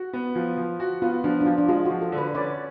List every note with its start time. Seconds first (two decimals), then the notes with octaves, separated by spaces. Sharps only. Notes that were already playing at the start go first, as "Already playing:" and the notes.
Already playing: F#4
0.13 B3
0.35 F3
0.57 F3
0.80 F#4
1.02 B3 F4
1.24 F3 D4
1.41 D4
1.46 F3 F4
1.58 D4
1.68 G#3 F4
1.85 F#4
1.90 F3
2.02 A4
2.12 D3
2.18 B4
2.35 C#4 B4 D5